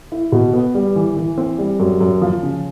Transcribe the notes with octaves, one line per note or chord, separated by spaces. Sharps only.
E4
B2
B3
G3
E3
E3
C4
G3
F#2
F#2
F3
C#3